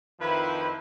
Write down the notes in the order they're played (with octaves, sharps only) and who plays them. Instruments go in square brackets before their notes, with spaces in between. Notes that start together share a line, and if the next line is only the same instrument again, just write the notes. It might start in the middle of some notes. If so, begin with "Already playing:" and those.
[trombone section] F2 D#3 F3 E4 B4